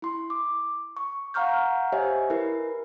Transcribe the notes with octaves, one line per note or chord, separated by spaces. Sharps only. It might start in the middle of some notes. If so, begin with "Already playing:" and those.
E4 C6
D6
C#6
F5 F#5 A#5 C#6 F6 G6
G4 C5 C#5 D#5 E5 G#5
E4 A#4 B4